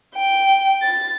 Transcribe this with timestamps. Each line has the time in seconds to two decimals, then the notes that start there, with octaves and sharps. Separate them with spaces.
0.16 G5
0.83 A6